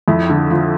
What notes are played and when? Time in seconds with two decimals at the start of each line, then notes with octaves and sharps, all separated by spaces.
0.08 F2 E4
0.30 D3
0.51 F3